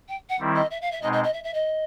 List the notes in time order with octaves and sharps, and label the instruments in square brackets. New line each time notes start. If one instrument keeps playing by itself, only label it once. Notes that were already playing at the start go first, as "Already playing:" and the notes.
[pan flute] G5
F#5
[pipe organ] D#3 G3 C4 E4
[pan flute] D#5
E5
F5
E5
[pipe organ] B2 G#3 C4 D#4 [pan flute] D#5
[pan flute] D#5
D#5
E5
E5
D#5